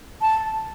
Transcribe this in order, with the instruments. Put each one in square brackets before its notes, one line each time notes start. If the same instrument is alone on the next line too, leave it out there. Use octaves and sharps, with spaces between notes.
[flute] A5